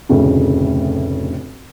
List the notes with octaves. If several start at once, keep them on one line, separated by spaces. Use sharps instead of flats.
F1 D2 A2 C#3